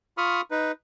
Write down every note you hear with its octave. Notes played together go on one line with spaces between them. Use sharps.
F4 B5 C#6 D#6 F6
D#4 B4